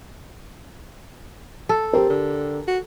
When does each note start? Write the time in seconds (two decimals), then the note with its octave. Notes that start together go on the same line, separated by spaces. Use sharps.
1.69 A4
1.93 C4 G4 A#4
2.10 D3
2.68 F#4